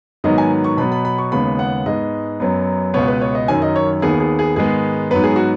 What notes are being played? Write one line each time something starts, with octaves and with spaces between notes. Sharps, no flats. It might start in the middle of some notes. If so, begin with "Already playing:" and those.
G#2 D#3 F#3 B3 D#5
G#5
C#6
B2 F#3 B3 B5
B5
B5
C#6
D#2 C#3 G#3 B3 B5
F#5
G#2 G#3 B3 D#5
F#2 F#3 B3
C#2 B2 B3 C#5
B4
C#5
D#5
F#2 D#3 F#3 G#5
D#5
C#5
D#2 D#3 B3 G#4
G#4
G#4
G#2 D#3 G#3 B3 G#4
G#2 F#3 B3 B4
G#4
F#4